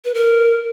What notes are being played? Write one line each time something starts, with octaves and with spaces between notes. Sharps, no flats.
B4
A#4